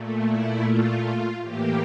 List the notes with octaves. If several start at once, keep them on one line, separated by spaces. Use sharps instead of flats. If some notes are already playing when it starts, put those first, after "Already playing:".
Already playing: A#2 A3
E4
F4
A2 E3 A#3 G4